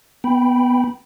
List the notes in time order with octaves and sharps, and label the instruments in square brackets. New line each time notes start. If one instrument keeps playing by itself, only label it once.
[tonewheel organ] B3 G5 B5